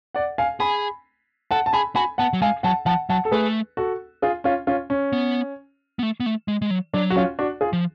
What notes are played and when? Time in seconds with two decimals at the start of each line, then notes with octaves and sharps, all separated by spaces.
0.15 D5 F#5
0.38 F5 G#5
0.60 G#4 G#5 B5
1.51 A4 F#5 A5
1.66 A5
1.73 G#4 G#5 B5
1.95 F#4 G#5 B5
2.18 B3 F#5 A5
2.33 F#3
2.42 G#3 F5 G#5
2.63 F#3 F#5 A5
2.86 F3 F#5 A5
3.09 F#3 F#5 A5
3.25 A4
3.32 A3 G#4 B4
3.77 F#4 A4
4.22 F4 G#4
4.44 C#4 F4
4.67 C#4 F4
4.90 C#4
5.13 B3
5.99 B3
6.03 A3
6.20 B3
6.26 A3
6.48 G#3
6.62 G#3
6.71 F#3
6.94 F#3 D4
7.10 F#4
7.16 C#4 F4
7.39 D4 F#4
7.61 F4 G#4
7.73 F3